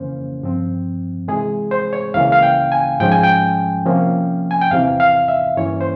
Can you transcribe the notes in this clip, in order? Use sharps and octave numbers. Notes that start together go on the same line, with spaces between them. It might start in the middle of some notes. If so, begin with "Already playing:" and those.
Already playing: F2 C#3 E3 A#3 C#4 C5
G2 F3 C4
C3 E3 G#3 G#4
C5
C#5
C#2 C#3 E3 A#3 C#4 F5
F5
G5
G#5
G#2 F3 G#3 C#4 G5
G#5
G5
C3 F3 A#3 C#4
G#5
G5
E2 C3 E3 F5
F5
E5
G2 E3 A#3 C#4 C#5
C5